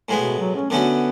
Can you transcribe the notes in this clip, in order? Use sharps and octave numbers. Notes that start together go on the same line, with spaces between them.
A2 G#3 B3
B2
F#3
C#4
D3 A3 B3 C#4 F#4